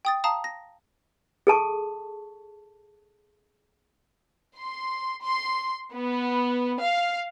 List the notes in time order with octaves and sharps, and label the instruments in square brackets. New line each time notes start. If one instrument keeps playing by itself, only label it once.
[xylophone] G5 D#6 A6
F5 A5 A#5 D#6
A#6
[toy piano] G#4 A4 A5 C#6
[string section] C6
C6
B3
F5